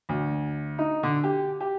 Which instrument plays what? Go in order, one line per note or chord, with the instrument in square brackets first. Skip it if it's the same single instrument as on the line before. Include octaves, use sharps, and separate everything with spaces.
[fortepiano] D2
D#4
D3
G4
G4